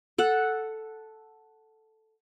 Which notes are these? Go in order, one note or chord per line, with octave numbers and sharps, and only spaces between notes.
A4 F#5